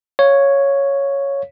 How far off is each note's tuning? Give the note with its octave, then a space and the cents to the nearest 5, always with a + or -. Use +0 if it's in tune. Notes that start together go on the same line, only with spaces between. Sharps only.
C#5 +0 F5 +0